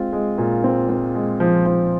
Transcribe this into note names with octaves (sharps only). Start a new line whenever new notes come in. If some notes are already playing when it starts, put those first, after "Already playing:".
Already playing: G#3 C4 F4
G#3
A#2
C4
C4
G#3
F3
F3